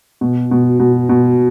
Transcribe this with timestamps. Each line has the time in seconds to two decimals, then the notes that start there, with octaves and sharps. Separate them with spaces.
0.21 B2
0.51 B2
0.79 B2
1.09 B2